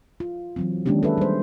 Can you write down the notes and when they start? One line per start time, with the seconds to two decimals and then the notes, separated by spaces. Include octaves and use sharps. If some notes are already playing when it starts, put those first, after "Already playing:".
0.20 F4
0.56 E3 F#3 C4
0.86 D#3 G#3 A#3 C#4 D4 G4
1.03 A4 B4 E5
1.18 G3 C5